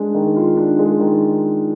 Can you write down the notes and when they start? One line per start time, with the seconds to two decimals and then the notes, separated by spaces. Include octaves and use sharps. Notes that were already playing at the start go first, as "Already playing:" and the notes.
Already playing: G#3 D4
0.14 D#3
0.36 F4
0.57 D4
0.79 G#3
1.00 D#3